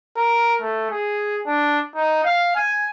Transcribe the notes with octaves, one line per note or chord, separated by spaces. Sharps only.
A#4
A3
G#4
D4
D#4
F5
G#5